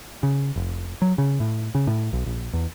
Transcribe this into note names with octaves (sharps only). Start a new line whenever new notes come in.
C#3
F1
F#3
C#3
A2
C#3
A2
B1
A#1
E2